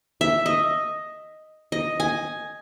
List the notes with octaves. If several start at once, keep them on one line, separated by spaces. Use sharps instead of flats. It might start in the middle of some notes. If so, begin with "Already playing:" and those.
E5
D#5
D#5
G#5